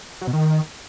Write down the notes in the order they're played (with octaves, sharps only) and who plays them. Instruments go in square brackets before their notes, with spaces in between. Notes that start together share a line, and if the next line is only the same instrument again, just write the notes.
[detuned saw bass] F#3
B2
D#3